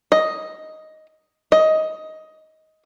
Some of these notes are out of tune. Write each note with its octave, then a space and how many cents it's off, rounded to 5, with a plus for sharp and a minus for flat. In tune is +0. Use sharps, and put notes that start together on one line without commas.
D#5 +5
D#5 +15